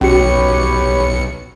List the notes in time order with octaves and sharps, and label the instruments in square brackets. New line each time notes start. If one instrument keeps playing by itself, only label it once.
[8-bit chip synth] B1 C#7 [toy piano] C#4 F#4 [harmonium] G4 B4 C#5